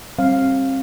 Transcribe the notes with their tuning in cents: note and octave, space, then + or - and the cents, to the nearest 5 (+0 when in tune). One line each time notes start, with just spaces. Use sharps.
G3 +5 C4 +35 F5 +0